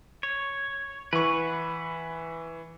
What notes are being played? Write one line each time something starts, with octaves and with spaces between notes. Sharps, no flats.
C#5
E3 B4 F#5 C#6